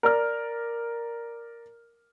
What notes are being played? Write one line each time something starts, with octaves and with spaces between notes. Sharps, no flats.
A#4 D5 F6